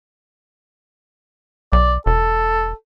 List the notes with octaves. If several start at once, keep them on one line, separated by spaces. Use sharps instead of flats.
B1 D5
E1 A4